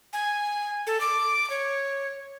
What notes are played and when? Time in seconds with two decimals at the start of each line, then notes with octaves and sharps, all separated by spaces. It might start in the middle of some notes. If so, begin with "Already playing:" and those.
0.13 G#5
0.87 A4
1.00 D6
1.50 C#5